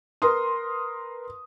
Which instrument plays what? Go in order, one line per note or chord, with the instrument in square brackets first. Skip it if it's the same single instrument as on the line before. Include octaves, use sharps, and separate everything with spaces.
[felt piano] A#4 B4 C6 D#6